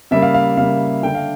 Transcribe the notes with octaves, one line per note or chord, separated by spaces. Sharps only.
C#3 G3 A#3 E5
F5
F5
C#3 G3 A#3 F5
D3 A3 D4 G5
F5